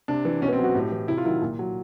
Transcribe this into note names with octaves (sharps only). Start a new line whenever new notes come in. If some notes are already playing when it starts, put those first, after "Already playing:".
C3 D4
E3
B2 C#4
B3
C4
F#3 F#4
A2 G4
E3
C3 E4
F4
D#3 F#3 E4
A#2
F#3